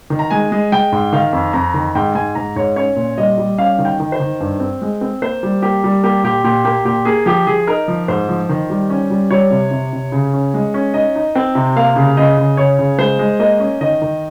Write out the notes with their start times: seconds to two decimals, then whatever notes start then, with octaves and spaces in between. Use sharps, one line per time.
0.10 D#3
0.19 A#5
0.31 G#3 G#5
0.52 G#3
0.72 G#3 G5
0.92 G#2
1.13 D#3 F5
1.33 F2
1.53 F2 A#5
1.74 D#3
1.95 G#2 G5
2.15 G#2 G#5
2.35 G#2 A#5
2.56 G#2 C#5
2.76 C#4 C#5
2.96 A#2
3.18 G3 D#5
3.38 G3
3.58 C#4 F5
3.78 D#3
3.85 G5
4.00 D#3
4.12 C5
4.20 D#3
4.40 G2
4.60 C4
4.82 G#3
5.01 C4
5.22 A#3 C5
5.43 G3
5.62 A#3 G4
5.84 G3
6.03 A#3 G4
6.24 A#2 G4
6.44 A#2 G4
6.65 A#3 G4
6.85 A#2 G4
7.05 A#3 G#4
7.26 F3 G4
7.47 F3 G#4
7.67 D#4 A#4
7.88 F3
8.08 G#2 C5
8.29 F3
8.49 D#3
8.70 G3
8.90 C#4
9.10 G3
9.31 G3 C#5
9.51 C3
9.71 C3
9.93 C3
10.12 C#3
10.33 C#4
10.54 G#3
10.74 C#4
10.94 D#4 D#5
11.15 D#4
11.35 C4 G5
11.55 C3
11.76 A#3 F5
11.96 C#3
12.17 C#3 D#5
12.37 C#3
12.57 C#3 C#5
12.79 C#3
12.98 G#3 C5
13.19 G#3
13.39 A#3 D#5
13.60 C#4
13.81 D#3 D#5
14.02 D#3